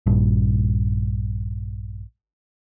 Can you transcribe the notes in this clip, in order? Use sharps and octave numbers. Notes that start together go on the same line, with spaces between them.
A#1 G2